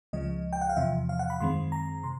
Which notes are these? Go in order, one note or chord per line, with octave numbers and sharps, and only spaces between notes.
C#2 C#3 F3 G#3 D#5
G5
F#5
F5
E2 C3 F3 E5
F5
F#5
B5
F#2 D#3 G#3 C4 C6
A#5
C3 C6